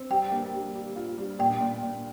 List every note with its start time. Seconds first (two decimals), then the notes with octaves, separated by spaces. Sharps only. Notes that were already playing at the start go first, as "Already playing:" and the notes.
Already playing: C4
0.10 G3 G5
0.32 A#3
0.54 G3
0.75 G3
0.96 F4
1.18 G3
1.39 A#2 G5
1.60 A#2
1.83 A#2